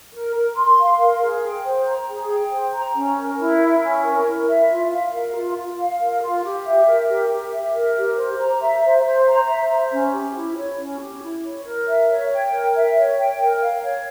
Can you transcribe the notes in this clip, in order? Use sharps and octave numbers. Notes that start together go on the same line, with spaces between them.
A#4
A#4
C6
F5
A#4
G#4
G5
C5
A#5
G#4
G5
C5
A#5
C#4
A#4
E4
E5
C#4
A#4
E4
E5
F4
F5
A#4
F4
F4
F5
A#4
F4
G4
E5
A#4
G4
G4
E5
A#4
G4
C5
A#5
E5
C5
C5
A#5
E5
C5
C#4
G4
E4
C#5
C#4
G4
E4
C#5
A#4
E5
C#5
G5
A#4
E5
C#5
G5
A#4
F5
C#5